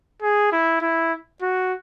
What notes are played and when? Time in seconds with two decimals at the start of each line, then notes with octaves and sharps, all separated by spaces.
0.22 G#4
0.52 E4
0.81 E4
1.42 F#4